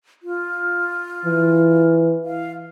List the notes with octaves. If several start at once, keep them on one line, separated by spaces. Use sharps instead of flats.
F4
E3
F5